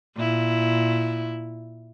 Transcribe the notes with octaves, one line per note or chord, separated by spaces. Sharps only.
A#2 E4